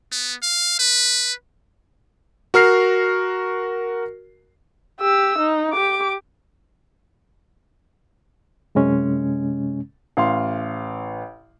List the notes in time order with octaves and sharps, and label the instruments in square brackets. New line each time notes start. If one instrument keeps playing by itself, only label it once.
[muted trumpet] B3
F5
B4
[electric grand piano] F#4 A#4 F6 C7
[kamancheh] G4 E6
D#4
G4 D6
[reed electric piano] F#2 C3 G#3 C#4
[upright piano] A1 F5 C6